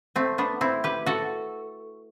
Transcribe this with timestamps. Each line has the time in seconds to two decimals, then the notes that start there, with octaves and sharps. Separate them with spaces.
0.16 A3 C4
0.38 B3 D4
0.61 C4 E4
0.84 G4 B4
1.06 F#4 A4